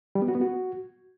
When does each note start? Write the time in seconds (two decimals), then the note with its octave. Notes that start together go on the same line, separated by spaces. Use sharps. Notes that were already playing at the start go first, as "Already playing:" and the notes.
0.15 G3
0.22 B3
0.28 F#4
0.35 B3
0.41 F#4